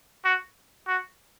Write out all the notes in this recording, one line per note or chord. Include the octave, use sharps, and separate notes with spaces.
F#4
F#4